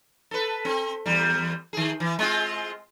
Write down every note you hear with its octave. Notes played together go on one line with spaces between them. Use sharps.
A4 B4
C4
E2 G3
D#3 G#4
E3
G#3 C4 F4